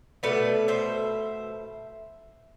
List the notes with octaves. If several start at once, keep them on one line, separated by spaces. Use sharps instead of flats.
B2 A3 B4 D5
C5 E5